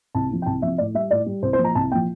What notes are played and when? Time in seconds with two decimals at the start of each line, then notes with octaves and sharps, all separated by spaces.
0.15 C2 A5
0.30 C3 F3
0.42 G5
0.46 C2 A5
0.62 C3 F3 E5
0.78 A2 D5
0.94 G3 E5
1.11 A2 D5
1.26 G3
1.42 C2 C5
1.53 C5
1.59 A#2 F3
1.64 A#5
1.75 C2 A5
1.91 A#2 G5
1.95 F3